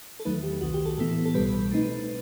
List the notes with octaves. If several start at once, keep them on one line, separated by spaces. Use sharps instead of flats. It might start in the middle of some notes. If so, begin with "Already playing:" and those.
A4
E2 D#3 F#3 A3 D#4 B4
G4
C2 C3 D#3 F#4
G4
A4
A2 E3 B3 E4
A4
C2 B2 G3 B4
B2 A3 C4 D#4